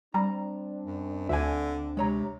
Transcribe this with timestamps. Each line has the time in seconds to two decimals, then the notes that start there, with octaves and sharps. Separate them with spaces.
0.14 G3 C4 D4 A#5
0.86 F#2
1.29 D2 D3 E5 G#5
1.97 C3 G#3 C#5 A#5